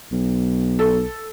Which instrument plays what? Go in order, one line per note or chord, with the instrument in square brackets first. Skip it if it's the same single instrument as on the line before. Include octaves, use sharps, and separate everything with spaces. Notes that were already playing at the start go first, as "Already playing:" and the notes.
[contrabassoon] B1
[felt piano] A4